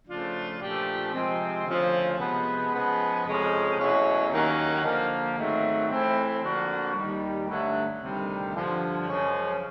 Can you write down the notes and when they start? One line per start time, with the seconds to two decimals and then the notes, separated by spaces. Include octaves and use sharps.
0.07 C#3 F3 A3 D4 F4
0.60 A#2 F3 A3 D4 G4
1.12 C3 F3 G#3 C4
1.65 D2 C#3 F3
2.18 C3 F3 G#3 B3
2.71 C#3 F3 G#3 B3
3.25 F2 C3 F3 G#3 C#4
3.77 E2 B2 F#3 A3 C#4
4.30 D#2 D#3 F#3 A#3 C#4
4.83 D3 F3 A#3
5.37 G#2 D#3 F#3 A3 C4
5.89 A2 E3 A3 C4
6.42 D3 F3 A#3 D4 F#4
6.95 D#2 D#3 G3
7.48 G2 D3 F#3 A3
8.01 D2 C3 D#3 G3
8.54 G2 D3 F3
9.07 F#2 C#3 F3 G#3 C#4